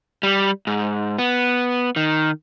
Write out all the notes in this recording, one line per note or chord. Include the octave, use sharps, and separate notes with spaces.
G3
G#2
B3
D#3